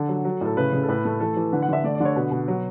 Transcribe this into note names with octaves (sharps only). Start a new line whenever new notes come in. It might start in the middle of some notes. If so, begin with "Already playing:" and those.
Already playing: D3 A4
F#3
F#3
A2 A4
C#3 B4
C#3
A4
A2 B4
A3
E3 A4
E3
D3 B4
F#5
D3 E5
A3 D5
D5
D3
C#5
B2 B4
B2
F#3